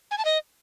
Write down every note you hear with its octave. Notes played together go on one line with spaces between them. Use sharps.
G#5
A5
D#5